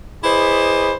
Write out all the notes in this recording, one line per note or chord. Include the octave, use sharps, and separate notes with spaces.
E4 G#4 B4 C5 D5 D#5